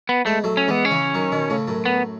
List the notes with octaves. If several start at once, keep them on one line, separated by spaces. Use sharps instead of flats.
B3
G#3 A3 B3
F#3 A3
C#4
E3 G#3 B3
C#4
C#3 E3
D#3 F#3
B2 D#3
A2 C#3
F#2 A2
B3